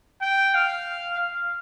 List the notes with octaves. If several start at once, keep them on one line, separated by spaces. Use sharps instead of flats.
G5
F5
F5